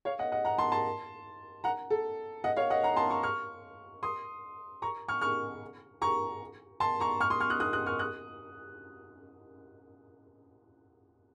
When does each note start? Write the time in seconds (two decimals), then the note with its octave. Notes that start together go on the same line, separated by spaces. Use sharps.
0.05 C#5 F5
0.19 D#5 F#5
0.32 D#5 F#5
0.45 F#5 A#5
0.58 A5 C6
0.72 A5 C6
1.64 F#5 A#5
1.90 A4
2.44 D#5 F#5
2.56 C#5 F5
2.70 D#5 F#5
2.83 F#5 A#5
2.96 A5 C6
3.10 A#5 C#6
3.23 C#6 F6
4.03 C6 D#6
4.82 A#5 C#6
5.08 C#6 F6
5.21 C#6 F6
6.02 A#5 C#6
6.80 A5 C6
7.00 A#5 C#6
7.20 C#6 F6
7.30 C6 D#6
7.40 C#6 F6
7.50 D#6 F#6
7.60 D#6 F#6
7.73 D#6 F#6
7.86 C#6 F6
7.99 D#6 F#6